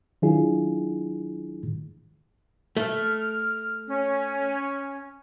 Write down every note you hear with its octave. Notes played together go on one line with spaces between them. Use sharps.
D#3 F#3 D4 E4 F4 G#4
A3 F6
C#4